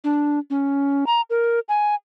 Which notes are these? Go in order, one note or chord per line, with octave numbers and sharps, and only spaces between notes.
D4
C#4
A#5
A#4
G#5